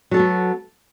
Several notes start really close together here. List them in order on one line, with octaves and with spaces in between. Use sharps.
F#3 A4 F#4 B3